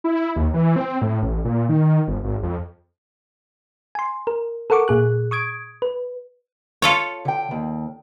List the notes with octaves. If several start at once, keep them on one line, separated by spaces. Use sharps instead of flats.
E4
D#2
E3
C4
A2
A1
A#2
D#3
G1
G#1
F2
G#5 C6
A#4
A4 A#4 F#5 C#6 D6
A#2 G#4 F#6
C#6 D#6 G#6 D7
B4
F4 A4 C#5
D3 G5
D#2